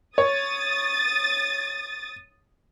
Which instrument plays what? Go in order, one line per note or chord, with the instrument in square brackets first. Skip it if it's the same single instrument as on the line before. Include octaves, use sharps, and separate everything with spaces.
[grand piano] C#5 [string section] D#6 A6